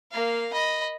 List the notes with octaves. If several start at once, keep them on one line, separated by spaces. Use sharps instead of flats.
A#3 F5
D#5 B5